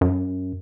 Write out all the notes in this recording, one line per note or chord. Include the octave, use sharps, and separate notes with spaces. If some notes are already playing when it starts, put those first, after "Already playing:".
F#2